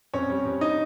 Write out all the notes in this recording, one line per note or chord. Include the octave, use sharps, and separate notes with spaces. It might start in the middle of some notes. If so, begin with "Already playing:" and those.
F2 C#4 C#5
G3
F2
D#4 D#5